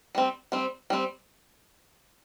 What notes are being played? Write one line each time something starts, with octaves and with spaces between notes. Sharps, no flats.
G3 C4
G3 C4
G3 C4